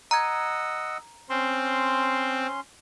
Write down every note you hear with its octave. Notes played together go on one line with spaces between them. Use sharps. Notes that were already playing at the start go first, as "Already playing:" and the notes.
D#5 F#5 A#5 E6 G#6
C4 C#4 C6